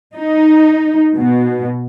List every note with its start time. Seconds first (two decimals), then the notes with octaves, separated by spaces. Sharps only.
0.17 D#4
1.16 B2